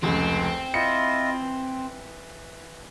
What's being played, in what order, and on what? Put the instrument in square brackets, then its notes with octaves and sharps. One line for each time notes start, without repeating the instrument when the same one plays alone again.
[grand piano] F1 C#2 [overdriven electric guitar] C4
[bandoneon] E4 F4 D#5 [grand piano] C#7
[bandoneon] E3